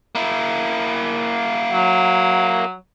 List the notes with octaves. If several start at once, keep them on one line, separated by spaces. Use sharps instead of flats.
A#3 E4
F#3